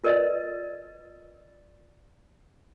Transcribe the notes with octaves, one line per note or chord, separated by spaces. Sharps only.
F4 A#4 B4 D5 D#5